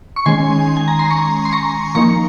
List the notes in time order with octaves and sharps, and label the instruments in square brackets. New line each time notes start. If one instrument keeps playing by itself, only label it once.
[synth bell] C#6
D#3 G#3 C#4 G#5 C6
G#5
A#5
C6
A#5 C#6
C6
A#5 C#6
F3 A#3 D#4 A#5 C#6